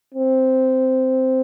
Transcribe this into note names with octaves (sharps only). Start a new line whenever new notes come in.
C4